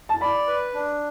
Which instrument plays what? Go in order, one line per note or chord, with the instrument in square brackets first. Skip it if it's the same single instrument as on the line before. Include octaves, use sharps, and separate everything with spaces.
[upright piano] A5
[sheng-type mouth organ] D5 [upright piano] B5
[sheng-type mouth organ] B4
D4